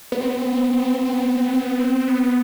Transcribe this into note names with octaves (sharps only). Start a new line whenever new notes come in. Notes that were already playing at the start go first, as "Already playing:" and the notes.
B3
C4
B3
C4
B3
C4
B3
C4
B3
C4
B3
C4
B3
C4
B3
C4
B3
C4
B3
C4
B3